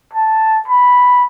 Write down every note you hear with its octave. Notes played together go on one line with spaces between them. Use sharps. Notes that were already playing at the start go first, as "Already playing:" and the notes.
A5
B5